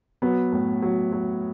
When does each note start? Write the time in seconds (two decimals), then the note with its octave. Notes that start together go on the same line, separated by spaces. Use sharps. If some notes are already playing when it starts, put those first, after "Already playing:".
0.22 F#3 B3
0.52 A2
0.82 F#3
1.12 F#3